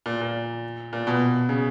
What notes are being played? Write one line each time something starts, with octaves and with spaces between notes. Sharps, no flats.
A#2
A#2
A#2
B2
C#3